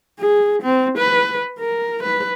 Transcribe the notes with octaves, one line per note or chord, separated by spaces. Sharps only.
G#4
C4
B4
A#4
B4